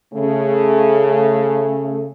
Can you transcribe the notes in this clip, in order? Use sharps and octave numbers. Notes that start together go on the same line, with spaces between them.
C#3 A3